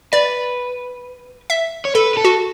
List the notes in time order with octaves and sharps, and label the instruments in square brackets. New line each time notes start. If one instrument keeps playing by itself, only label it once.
[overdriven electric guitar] B4 [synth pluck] D5
[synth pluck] E5
[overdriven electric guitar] C#5
[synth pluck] A4 [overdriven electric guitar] B4
[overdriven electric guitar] B4
A4
[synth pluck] F#4